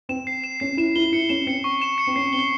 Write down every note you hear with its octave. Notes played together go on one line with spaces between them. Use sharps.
C4 E7
C7
E7
C#4 C7
E4 E7
E4 G7
E4 C#7
C#4 E7
C4 C#7
C#6
E7
C#7
C4
C#4 C7
C4 G7